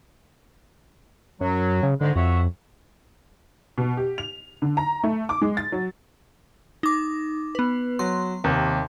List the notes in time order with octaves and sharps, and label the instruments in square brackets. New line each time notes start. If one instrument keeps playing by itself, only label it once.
[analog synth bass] F#2 [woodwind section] F#3
[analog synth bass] C#3
[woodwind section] G#2 D#3 G#3 [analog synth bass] D3
[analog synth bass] F2 [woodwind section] F#4 C#5 E5
[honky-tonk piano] B2
G4
F7
D3
A#5
A3
D6
G#3
A6
F#3
[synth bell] D#4 D6
B3 B4
[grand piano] F#3 [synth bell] C6
[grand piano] D#2 C3